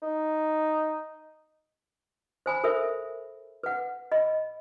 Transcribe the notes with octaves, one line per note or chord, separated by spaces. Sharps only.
D#4
C5 G#5 B5
A4 A#4 C5 E5
B4 F#5
D#5 B5